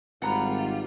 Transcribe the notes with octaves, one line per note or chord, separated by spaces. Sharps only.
G#1 G3 F4 F#5 A#5 B5